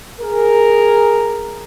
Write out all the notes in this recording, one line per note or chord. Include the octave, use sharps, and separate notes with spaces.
G#4 A#4